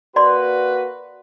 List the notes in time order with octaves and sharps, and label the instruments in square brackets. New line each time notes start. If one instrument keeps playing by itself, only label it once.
[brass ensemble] A#3 F#4 B4 [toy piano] D5 C6